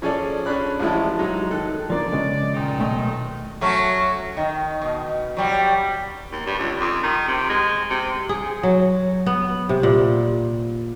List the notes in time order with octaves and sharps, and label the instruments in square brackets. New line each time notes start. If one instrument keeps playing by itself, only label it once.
[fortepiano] F3 C#4 G#4 A4 D5
C#4 D4 G#4 D5 B5 F#6
A1 F3 G#3 E4 A5
F#3 G#3 D#4
D#3 A4 F#6
[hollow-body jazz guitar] F3 A#3 D4 [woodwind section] D5
[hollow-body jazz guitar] C#3 G#3
[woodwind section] A#2 D#3 D#4
[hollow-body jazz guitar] B1 A3 D#5
[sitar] F#3 A3 C#4
D#3
B2
F#3 G3
[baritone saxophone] D#2
G2
C#2
F2
D#3
C3
G#3
C3
[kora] G#4
F#3
B3
C3
A#2